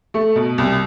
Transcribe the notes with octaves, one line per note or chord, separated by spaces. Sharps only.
A3
B2
C2